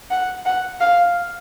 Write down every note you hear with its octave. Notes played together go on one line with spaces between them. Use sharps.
F#5
F#5
F5